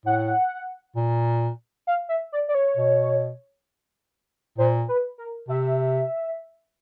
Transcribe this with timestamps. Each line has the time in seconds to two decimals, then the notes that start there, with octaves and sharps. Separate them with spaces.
0.06 A2 F#5
0.96 A#2
1.87 F5
2.09 E5
2.32 D5
2.49 D5
2.55 C#5
2.77 B2
4.58 A#2 C5
4.88 B4
5.18 A#4
5.49 C3 E5